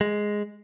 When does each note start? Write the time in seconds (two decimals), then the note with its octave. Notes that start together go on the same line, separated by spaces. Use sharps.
0.01 G#3